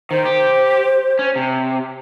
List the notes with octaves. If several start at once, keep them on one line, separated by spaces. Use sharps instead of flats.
D#3 C5
G4
C#4
C3